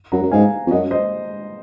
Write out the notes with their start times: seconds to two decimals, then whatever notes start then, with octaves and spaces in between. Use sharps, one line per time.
0.12 F#2 F#5 A#5
0.23 F#2
0.31 G#2 F5 G#5
0.67 F2
0.71 F#2 D#5 F#5
0.91 C5 D#5